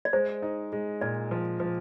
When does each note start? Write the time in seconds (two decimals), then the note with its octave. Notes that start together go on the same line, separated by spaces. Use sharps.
0.05 D5
0.13 G#3 C5
0.42 D#4
0.72 G#3
1.01 A#2 D5
1.31 F3
1.60 F3